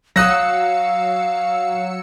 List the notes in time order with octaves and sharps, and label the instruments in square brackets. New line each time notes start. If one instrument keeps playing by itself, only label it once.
[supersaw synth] F#3 E6 C#7 [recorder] F5 [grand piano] D#6 F#6 A#6